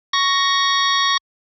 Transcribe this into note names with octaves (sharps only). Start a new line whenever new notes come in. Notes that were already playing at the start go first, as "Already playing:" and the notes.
C#6 A#6